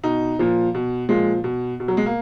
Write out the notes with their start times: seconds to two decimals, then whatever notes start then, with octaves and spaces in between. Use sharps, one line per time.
0.03 B2 D#4
0.39 A#2 F3
0.75 B2
1.09 A#2 F3 G#3
1.44 B2
1.80 B2
1.88 F#3
1.97 G#3
2.06 A#3